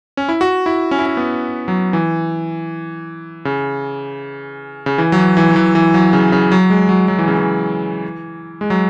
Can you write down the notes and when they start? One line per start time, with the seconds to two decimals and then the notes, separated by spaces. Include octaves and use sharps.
0.17 C#4
0.29 E4
0.41 F#4
0.66 E4
0.91 C#4
0.99 E4
1.06 C#4
1.17 B3
1.68 F#3
1.93 E3
3.45 C#3
4.86 C#3
4.98 E3
5.12 F#3
5.18 E3
5.37 E3
5.50 F#3
5.56 E3
5.75 E3
5.94 F#3
6.13 C#3
6.32 C#3
6.52 F#3
6.70 G#3
6.89 F#3
7.08 F#3
7.19 E3
7.28 C#3
7.38 E3
8.61 G#3
8.70 F#3